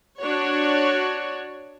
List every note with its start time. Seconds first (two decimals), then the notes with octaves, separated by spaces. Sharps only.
0.20 D4 F#4 C#5